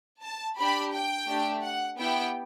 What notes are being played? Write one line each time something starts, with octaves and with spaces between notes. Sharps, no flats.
A5
D4 G4 B5
G5
A3 D4 G4
F#5
B3 E4 G4 G5